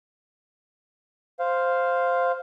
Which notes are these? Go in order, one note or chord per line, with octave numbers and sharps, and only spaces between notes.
C5 F5